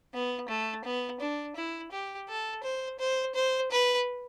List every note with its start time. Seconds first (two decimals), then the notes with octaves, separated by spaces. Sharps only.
0.14 B3
0.49 A3
0.84 B3
1.20 D4
1.56 E4
1.92 G4
2.29 A4
2.63 C5
2.99 C5
3.35 C5
3.71 B4